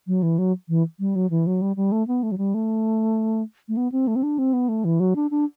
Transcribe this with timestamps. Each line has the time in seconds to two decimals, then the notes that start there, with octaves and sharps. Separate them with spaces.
0.07 F#3
0.22 E3
0.38 F#3
0.69 E3
1.00 G3
1.15 F#3
1.30 E3
1.47 F#3
1.62 G3
1.76 G3
1.92 A3
2.07 B3
2.23 A3
2.32 F#3
2.38 G3
2.54 A3
3.68 A3
3.77 B3
3.92 C4
4.07 A3
4.16 C4
4.23 D4
4.38 C4
4.53 B3
4.68 A3
4.84 E3
5.00 F#3
5.16 D4
5.31 D4